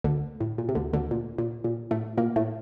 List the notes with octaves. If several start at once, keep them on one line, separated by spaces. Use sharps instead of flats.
D2 D3
A2
A#2
C3
D2 D3
D2 D3
A#2
A#2
A#2
A2 A3
A#2 A#3
A2 A3